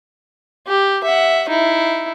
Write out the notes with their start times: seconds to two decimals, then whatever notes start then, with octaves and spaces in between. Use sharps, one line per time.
0.67 G4
1.04 E5 F#5
1.49 D#4 E4